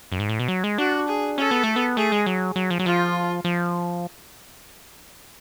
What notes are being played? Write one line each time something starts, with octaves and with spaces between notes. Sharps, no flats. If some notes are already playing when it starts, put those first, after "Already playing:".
F#2
G#2
A2
B2
F#3
G#3
D4 F#4
G#4
C#4 A4
B3
A3
B3
A3 G#4
G#3
F#3
F#3
F3
F#3
F3 F4
F3